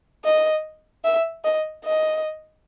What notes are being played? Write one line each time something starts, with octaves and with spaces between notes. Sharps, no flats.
D#5
E5
D#5
D#5